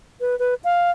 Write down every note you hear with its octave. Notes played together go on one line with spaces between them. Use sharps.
B4
B4
F5